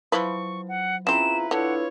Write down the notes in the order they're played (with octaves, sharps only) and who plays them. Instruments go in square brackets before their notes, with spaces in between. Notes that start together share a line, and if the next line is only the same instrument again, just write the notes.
[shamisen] F3 E4 B4 [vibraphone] F#3 [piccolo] C#6
[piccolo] F#5
[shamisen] C#3 C4 [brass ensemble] E4 F4 B4 [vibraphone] A#5 [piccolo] E7
[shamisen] D3 [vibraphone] D4 E4 [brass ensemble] F4 B4 C#5 [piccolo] F#5